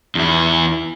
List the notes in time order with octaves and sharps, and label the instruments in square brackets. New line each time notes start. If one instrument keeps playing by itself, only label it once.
[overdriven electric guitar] E2 E4